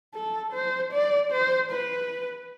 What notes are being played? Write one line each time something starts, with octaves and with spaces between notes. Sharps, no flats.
A4
C5
D5
C5
B4